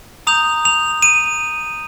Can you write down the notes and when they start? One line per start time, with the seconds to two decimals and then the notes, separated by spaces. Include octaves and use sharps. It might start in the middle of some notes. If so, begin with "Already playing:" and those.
0.27 A#5 D#6 G6 F7
0.65 F7
1.02 D#7